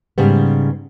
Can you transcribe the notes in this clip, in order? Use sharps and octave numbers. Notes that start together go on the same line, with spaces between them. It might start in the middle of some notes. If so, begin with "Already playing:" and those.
G#2 C#3 G3 B3